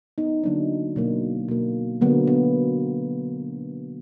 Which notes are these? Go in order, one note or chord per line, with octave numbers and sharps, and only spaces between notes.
B3 D#4
D3 F#3 A#3 D4
B2 F#3 A#3
B2 A#3
D3 F#3 A#3 B3
B3